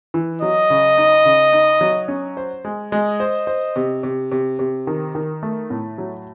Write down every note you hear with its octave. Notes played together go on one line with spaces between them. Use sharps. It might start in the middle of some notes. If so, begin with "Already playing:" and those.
E3
F#3 D#5
C#3
D#4
C#3
D#4
F#3
C#4
C5
G#3
G#3 D#5
C5
C5
C3
C3
C3
C3
D#3
D#3
A3
A2
F#3